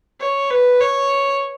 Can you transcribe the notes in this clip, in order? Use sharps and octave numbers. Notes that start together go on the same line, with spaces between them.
C#5
B4
C#5